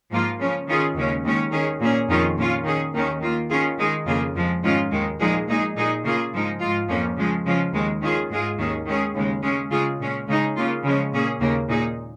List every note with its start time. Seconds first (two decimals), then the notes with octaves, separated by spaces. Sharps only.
0.12 G#2 F3 A#3 F4
0.39 C#3 F3 C#4
0.68 D#3 C#4 F4 G#4
0.95 D#2 C#3 G#3 C#4
1.24 D#2 D#3 G#3 C#4
1.52 D#3 C#4 G#4
1.80 A#2 A#3 C#4 G#4
2.08 F2 D#3 C#4 F4 G#4
2.37 A#2 A#3 C#4 F4
2.64 D#3 C#4 G#4
2.93 D#2 D#3 C#4
3.21 D#3 A#3 F4
3.50 D#3 C#4 F4 G#4
3.78 D#3 G#3 D#4 G#4
4.06 F2 C#3 A#3 F4 G#4
4.35 F2 F3 G#3
4.63 G#2 D#3 G#3 C#4 F4
4.91 D#2 D#3 G#3
5.20 A#2 F3 G#3 D#4 G#4
5.48 A#2 G#3 D#4 G#4
5.76 A#2 G#3 D#4 G#4
6.04 C#3 A#3 F4 G#4
6.33 G#2 F3 G#3 D#4
6.60 G#2 G#3 F4
6.89 F2 F3 A#3 C#4
7.17 C#3 F3 G#3
7.46 C#3 F3 G#3 C#4 F4
7.73 D#2 D#3 G#3
8.02 D#3 C#4 F4 G#4
8.30 G#2 G#3 F4 G#4
8.58 D#2 D#3 C#4 G#4
8.86 D#3 G#3 C#4 G#4
9.14 D#2 C#3 G#3
9.42 C#3 G#3 C#4 G#4
9.71 C#3 G#3 F4 G#4
10.00 A#2 G#3 C#4
10.28 C#3 G#3 D#4 G#4
10.56 C#3 A#3 F4
10.84 C#3 F3 G#3 C#4
11.12 A#2 A#3 C#4 G#4
11.40 D#2 C#3 A#3
11.69 A#2 G#3 D#4 G#4